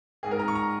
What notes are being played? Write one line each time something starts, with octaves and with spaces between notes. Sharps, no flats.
G#2 G#4
A#4
G#2 A#5
C#6
A#5